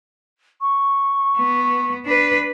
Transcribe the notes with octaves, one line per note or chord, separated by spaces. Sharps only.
C#6
B3
D4 B4